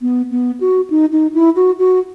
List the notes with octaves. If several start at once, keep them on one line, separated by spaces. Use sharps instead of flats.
B3
B3
F#4
D#4
D#4
E4
F#4
F#4